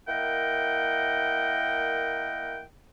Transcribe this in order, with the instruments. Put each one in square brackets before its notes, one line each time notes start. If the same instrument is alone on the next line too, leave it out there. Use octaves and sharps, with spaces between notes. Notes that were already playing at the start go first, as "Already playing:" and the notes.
[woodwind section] A#3 E4 A#4 D#5 F#5 G5